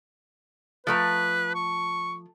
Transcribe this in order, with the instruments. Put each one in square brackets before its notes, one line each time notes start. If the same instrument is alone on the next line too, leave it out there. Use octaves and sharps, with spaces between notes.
[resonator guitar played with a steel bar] F3 A3 A#5 [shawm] B4
[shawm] C#6